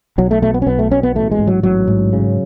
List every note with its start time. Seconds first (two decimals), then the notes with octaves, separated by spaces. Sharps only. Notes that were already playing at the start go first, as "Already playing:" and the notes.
0.18 B1 F#3
0.31 A3
0.42 B2 A3
0.54 B3
0.62 C#4
0.67 B1 B3
0.79 A3
0.91 B2 C#4
1.03 B3
1.15 A1 A3
1.31 G#3
1.39 G#2
1.47 F#3
1.63 A1 F#3
1.88 G#2
2.13 C#3